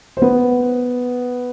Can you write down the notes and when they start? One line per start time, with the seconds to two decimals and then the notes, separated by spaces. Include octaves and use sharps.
0.17 C5
0.22 B3 B4